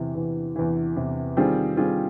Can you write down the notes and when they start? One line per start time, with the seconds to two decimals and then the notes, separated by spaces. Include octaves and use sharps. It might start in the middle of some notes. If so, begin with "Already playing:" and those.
Already playing: E2 C3 E3
0.15 E2 C3 E3
0.56 E2 C3 E3
0.96 E2 C3 E3
1.37 D#3 G3 C4 F4 G#4
1.77 D#3 G3 C4 F4 G#4